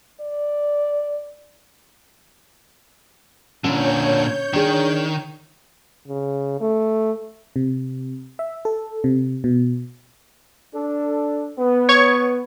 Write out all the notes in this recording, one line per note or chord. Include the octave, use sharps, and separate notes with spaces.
D5
A#2 D3 C#4 C#5 G6
D#3 D4 G#4
C#3
A3
C3
E5
A4
C3
B2
D4 A4
B3
C#5 C#6 G#6